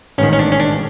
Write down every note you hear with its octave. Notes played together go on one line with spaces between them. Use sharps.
A1 G#2 D#3 C#4
C#4
D4
C#4
D4